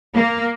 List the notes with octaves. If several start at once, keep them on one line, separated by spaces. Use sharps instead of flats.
A#3